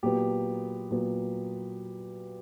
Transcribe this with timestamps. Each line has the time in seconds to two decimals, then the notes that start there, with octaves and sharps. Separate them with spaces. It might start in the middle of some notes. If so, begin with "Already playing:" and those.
0.03 A#2 F#3 B3 G4
0.91 A#2 F#3 B3